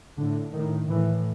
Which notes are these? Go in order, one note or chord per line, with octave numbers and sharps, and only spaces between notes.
A2 D3
A2 D#3
A2 E3